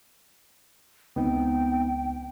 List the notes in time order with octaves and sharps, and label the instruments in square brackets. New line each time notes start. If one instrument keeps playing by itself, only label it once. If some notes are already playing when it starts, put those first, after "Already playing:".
[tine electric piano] C#2 [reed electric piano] B3 C4 D#4 [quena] G5